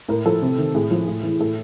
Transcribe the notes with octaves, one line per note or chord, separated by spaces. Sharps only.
A2 A#4
F3 A4
C3
D#3
A2 G#4
F3
A2
E3
A2 A4